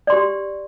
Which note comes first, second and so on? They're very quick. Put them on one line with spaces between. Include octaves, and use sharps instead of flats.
D5 C6 G4